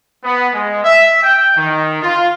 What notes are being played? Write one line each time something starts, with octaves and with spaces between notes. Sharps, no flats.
B3
G#3
E5
G5
D#3
F4